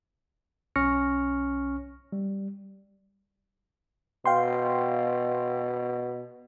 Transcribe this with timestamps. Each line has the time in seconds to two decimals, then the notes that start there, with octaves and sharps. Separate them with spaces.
0.76 B1 C#4 C#6 F6 A#6 C#7
2.12 G3
4.26 B2 F5 G5 C6